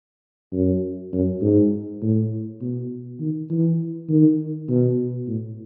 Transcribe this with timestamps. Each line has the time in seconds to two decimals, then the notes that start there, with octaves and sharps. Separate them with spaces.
0.53 F#2
1.13 F#2
1.42 G#2
2.02 A2
2.61 B2
3.20 D#3
3.50 E3
4.09 D#3
4.69 B2
5.28 A2